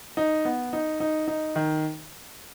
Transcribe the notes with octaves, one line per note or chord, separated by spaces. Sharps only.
D#4
B3
D#4
D#4
D#4
D#3